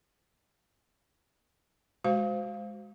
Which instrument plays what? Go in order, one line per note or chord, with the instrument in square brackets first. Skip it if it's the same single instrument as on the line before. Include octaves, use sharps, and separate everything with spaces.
[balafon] G#3 F#4 C5 F5